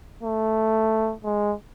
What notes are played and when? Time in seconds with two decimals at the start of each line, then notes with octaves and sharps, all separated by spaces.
0.23 A3
1.24 G#3